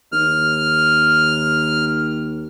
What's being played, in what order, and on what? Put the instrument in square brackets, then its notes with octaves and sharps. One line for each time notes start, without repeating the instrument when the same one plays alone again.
[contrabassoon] D#2 [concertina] F6